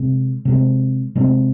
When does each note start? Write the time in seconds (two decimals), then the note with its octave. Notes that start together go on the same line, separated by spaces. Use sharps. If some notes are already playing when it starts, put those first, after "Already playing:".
Already playing: C3 G#3 C4
0.45 C3 G#3 C4
1.15 C3 G#3 C4